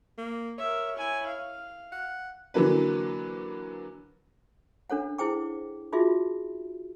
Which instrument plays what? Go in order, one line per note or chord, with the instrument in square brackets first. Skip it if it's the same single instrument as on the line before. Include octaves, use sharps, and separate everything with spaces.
[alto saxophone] A#3
[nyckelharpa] A#4 E5 [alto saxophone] C#5
[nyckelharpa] E4 G#5
F5
[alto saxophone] F#5
[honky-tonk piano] D3 E3 F#3 A#3 B4
[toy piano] D4 A4 C#5 F#5
E4 G#4 C5 G5 D6
D#4 F4 F#4 G#4 E5